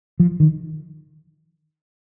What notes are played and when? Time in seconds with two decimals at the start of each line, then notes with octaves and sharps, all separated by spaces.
0.20 F3
0.40 D#3